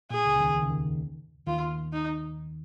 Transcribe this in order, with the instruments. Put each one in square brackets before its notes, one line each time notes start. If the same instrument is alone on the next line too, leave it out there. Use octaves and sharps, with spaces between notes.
[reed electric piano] A#2 [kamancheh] G#4
[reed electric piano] C#2 C#3
C#3
D#2 D#3
D#3
C#3
D#2 D#3
[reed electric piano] D#2 D#3 [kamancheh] F4
[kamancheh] D#4